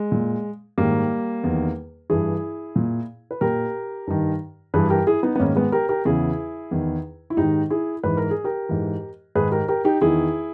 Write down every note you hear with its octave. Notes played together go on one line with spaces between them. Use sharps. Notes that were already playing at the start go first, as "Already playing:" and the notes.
Already playing: G#3
A#2
G#2 D#3 G3 A#3
E2 D#3
G2 E3 E4 G#4
A#2
B4
A#2 G4 A#4
G2 D#3
G2 E3 G#4 B4
G4 A#4
E4 G#4
B3 D#4
B3
G#2 D#3 A#3 C#4
G#3 B3
G4 A#4
G4 A#4
E2 C#3 E3 E4 G#4
E2 D#3
E4
G#2 D#3 D#4 G4
E4 G#4
G#2 E3 B4
A#4
G#4
G4 A#4
G#2 E3
G#2 D#3 G#4 B4
G4 A#4
G4 A#4
D#4 G4
E2 D#3 E4 G#4